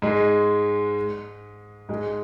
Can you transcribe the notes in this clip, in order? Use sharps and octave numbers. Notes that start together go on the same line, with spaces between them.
G#2 G#3
G#2 G#3